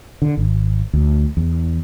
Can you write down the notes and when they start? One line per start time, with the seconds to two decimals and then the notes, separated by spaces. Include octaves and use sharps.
0.22 D3
0.37 G#1
0.93 D2
1.37 E2